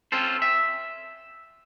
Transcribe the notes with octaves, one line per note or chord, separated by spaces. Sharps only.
C4 C#4 F4 A4 C5
E5